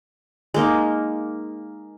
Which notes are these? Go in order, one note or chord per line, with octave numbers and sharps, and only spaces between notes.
G#3 A#3 D#4